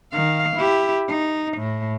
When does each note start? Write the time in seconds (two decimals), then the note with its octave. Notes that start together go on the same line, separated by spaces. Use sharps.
0.11 D#3 F5
0.56 E4 G4
1.08 D#4
1.57 A2